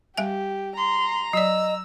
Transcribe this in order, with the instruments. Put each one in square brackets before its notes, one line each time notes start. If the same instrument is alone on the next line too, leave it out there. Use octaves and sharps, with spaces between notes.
[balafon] G3 E5 G#5 [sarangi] G4
[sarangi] A#5 [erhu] C6
[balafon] F#3 D5 [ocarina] D#5 [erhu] E6